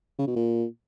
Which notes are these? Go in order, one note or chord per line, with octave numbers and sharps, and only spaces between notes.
C#3
B2
A#2